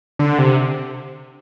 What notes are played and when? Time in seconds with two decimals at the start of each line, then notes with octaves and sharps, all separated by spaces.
0.19 D3
0.38 C3